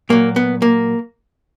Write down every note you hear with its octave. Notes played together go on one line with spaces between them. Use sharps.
A#2 F#3 A#3
B3
A#3